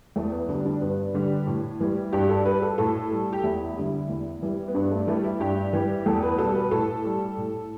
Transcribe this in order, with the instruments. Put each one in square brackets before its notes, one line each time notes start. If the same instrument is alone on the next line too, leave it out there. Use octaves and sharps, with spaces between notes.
[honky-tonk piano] E2 A3
B3
D3 G3 D4
D4
G2 B3
D3 G3
A2
E3 G3
G2 G4
A4
G3 B4
A4
A2 A4
G3
G4
E2 E4
D3 G3
E2
E3 G3
B3
G2 D4
A3
E3 G3 A3
E4
G2 G4
E3 G3
E2 A4
B4
B2 G3 A4
B4
A2 A4
G3
A2